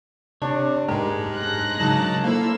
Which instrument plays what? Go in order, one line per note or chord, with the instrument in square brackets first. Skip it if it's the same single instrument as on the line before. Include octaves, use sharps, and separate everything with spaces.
[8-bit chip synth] C3 [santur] D4 [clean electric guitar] C#5
[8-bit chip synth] G#2 G#3 [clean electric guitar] G4 [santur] A#4
[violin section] F#6 A#6
[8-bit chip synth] C#3 D#4 A5 [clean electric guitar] F#3 G#3
[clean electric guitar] A#3 [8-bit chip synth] E4 F5 [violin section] A4 C5 E6